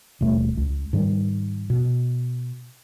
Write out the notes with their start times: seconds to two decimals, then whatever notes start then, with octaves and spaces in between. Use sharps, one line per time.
0.21 D#1 B2 A3
0.57 C#2
0.93 G#2 D#3 G3
1.70 B2